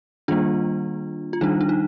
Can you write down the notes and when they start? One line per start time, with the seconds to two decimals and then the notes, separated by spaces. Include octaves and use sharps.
0.28 D#3 G3 A#3 D4 F4
1.33 F4
1.41 D#3 G3 D4 D#4
1.61 D4
1.69 D#4